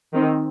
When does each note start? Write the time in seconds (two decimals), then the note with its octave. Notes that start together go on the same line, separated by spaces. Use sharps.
0.14 D#3 C4 D#4